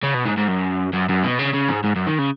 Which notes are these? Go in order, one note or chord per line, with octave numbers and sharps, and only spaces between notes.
C#3
B2
G#2
G#2
F#2
F#2
F#2
B2
C#3
C#3
G#2
G#2
F#2
D#3
C#3